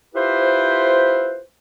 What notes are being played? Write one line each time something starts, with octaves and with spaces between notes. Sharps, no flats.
E4 F4 G4 B4 C5